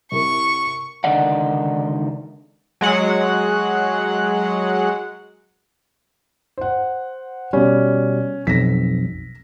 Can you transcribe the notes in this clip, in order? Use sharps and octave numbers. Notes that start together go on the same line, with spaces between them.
C3 E4 A#4 C#6
C#2 D3 D#3 D#4 D5 F#5
F#3 G#3 F#5
C5 F#5
B2 G3 C#4
B1 F2 A#6 B6